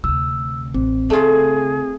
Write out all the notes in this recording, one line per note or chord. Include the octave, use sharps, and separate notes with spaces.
D2 C3 E6
A1 C4
C#3 A3 F4 G#4